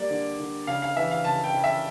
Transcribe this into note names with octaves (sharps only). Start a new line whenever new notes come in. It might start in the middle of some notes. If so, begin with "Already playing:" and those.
Already playing: G3 A#3 D5
D3
D3
C#3 F5
F5
E3 E5
F5
C#3 A5
G5
C#3
E5